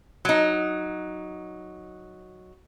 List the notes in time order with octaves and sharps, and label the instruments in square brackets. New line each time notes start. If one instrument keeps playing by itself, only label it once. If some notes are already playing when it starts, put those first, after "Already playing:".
[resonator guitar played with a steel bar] F#3 D#4